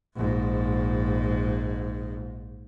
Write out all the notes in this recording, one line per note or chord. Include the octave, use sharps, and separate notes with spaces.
A#1 G#2